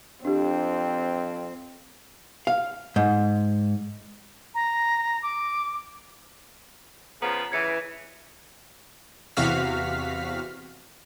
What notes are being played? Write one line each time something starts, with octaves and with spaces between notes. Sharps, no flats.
F2 C4 D4 G4
F5
G#2
A#5
D6
C#3 F3 B3 A#5
C#3 E3 G#6 C#7
E2 C3 F#4 F5 F6 B6